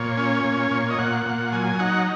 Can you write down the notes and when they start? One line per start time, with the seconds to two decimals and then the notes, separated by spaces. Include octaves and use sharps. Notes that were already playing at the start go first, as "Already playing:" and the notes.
Already playing: A#2 C#5
0.17 C#4
0.44 A#2
0.71 A#2
0.90 D#5
0.99 A#2 F#5
1.26 A#2
1.52 F#3 G#5
1.79 D#4 F#5